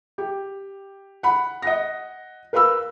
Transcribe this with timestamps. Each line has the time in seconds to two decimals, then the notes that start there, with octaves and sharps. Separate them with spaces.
0.18 G4
1.23 F#5 B5
1.62 D#5 F#5 A#6
2.53 A#4 B4 F5 B5 E6